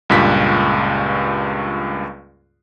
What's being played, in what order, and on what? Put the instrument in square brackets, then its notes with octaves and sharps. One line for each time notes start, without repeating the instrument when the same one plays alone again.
[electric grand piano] C#2 G2 A#2 B6